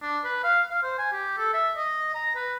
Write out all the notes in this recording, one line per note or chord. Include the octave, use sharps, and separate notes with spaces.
D4
B4
F5
F5
C5
G#5
G4
A4
E5
D#5
A#5
B4